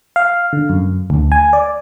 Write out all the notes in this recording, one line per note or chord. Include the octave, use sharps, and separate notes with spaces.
F5
D3
F#2
D2
G#5
D5